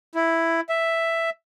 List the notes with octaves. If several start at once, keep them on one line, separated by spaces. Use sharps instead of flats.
E4
E5